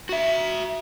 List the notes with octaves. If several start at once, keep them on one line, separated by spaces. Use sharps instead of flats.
F#4 E5